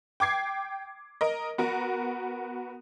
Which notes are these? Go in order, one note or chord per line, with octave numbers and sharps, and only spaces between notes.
G5 D6 G#6 C7
A#4 D#5
B3 F#4 A#4